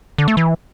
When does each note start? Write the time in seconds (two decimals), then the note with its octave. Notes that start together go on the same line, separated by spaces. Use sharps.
0.18 D3
0.28 A3
0.37 E3